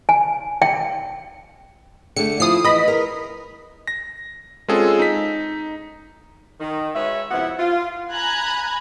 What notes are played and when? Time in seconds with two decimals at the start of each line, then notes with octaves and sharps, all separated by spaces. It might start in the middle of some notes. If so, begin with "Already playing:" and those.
0.09 G#5
0.62 G5
2.16 D3 A3 C#7
2.40 F3 E4 D#6 C7
2.64 E3 D#5 B5
2.88 A#4
3.87 A#6
4.68 G#3 C4 C#4 F4 G#4 A4
4.99 D#4 B6
6.61 D#3
6.95 G#3 F#4 B4 C#5 E5
7.31 F2 C3 B3 E4 F#5
7.59 F4
8.11 G#5 A#5 B5 F#6 G#6